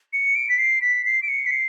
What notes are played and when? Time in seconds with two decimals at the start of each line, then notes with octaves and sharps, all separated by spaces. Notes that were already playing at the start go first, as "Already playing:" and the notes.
0.13 C#7
0.35 D7
0.49 B6
0.58 C7
0.81 B6
1.06 C7
1.22 D7
1.28 C#7
1.46 B6
1.51 C7